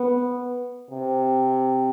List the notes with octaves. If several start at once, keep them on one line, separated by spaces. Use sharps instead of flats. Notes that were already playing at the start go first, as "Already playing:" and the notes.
Already playing: B3
C3